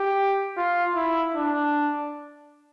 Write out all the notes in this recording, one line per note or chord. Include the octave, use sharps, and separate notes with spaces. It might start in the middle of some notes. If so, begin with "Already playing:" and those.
Already playing: G4
F4
E4
D4